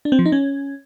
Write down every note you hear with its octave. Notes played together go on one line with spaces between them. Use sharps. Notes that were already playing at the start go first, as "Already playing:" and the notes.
D4
C4
F3
D#4
C#4